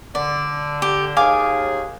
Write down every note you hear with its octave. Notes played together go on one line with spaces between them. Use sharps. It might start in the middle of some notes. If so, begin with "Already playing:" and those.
D3 D5
G4
D#2 G#4 F5 G#5 D6